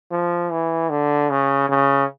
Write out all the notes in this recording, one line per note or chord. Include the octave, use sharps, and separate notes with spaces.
F3
E3
D3
C#3
C#3